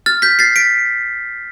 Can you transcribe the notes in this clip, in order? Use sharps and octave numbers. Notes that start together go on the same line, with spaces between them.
F6 A6
G6 B6
A6 C7
B6 D7